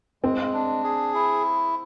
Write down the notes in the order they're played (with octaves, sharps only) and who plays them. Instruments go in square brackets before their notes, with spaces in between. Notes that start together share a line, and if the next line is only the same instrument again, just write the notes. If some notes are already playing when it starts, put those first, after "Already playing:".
[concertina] G#3 [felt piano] C4
[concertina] D4
G#4
E4